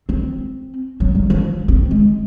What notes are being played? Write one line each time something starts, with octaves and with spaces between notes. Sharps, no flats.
C4
F#3
G3
F3
C4
G#3